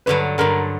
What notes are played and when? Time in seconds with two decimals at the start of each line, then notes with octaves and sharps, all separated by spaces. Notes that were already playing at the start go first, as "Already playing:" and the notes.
0.06 G2 D3 F#3 B4
0.38 G2 D3 F#3 A#4